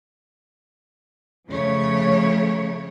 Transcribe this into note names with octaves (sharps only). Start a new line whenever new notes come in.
C#3 F3 A3 C#5